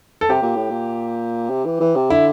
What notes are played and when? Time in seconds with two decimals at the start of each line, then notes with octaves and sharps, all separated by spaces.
0.21 A4
0.29 C3 G4
0.42 A#2
0.56 A2
0.70 A#2
1.50 C3
1.65 E3
1.80 E3
1.95 C3
2.10 D3 E4